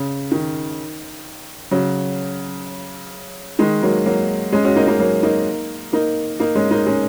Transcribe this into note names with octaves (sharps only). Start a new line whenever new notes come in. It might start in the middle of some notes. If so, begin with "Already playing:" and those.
Already playing: C#3
D#3
C#3 F#3
D#3 G#3
F#3 A#3
F#3 A#3
G#3 C#4
C#4 F#4
A#3 D#4
A#3 D#4
F#3 A#3
A#3 D#4
A#3 D#4
A#3 D#4
G#3 C#4
A#3 D#4
G#3 C#4